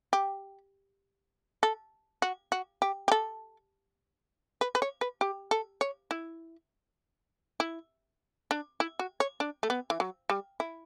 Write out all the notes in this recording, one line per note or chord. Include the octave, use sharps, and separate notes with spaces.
G4
A4
F#4
F#4
G4
G4
A4
B4
B4
C#5
B4
G4
A4
C#5
E4
E4
D4
E4
F#4
C#5
D4
A3
B3
E3
F#3
G3
E4